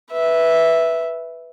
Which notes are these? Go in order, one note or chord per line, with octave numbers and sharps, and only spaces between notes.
B4 E5